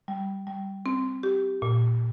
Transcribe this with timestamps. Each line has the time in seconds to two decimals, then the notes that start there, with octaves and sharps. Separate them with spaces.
0.08 G3
0.47 G3
0.86 C4
1.23 G4
1.62 A#2